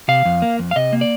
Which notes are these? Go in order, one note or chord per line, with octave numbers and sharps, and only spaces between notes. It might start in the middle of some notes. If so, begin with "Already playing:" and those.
C3 F5
F2
A#3
F2
F5
C3 D#5
A#3
D5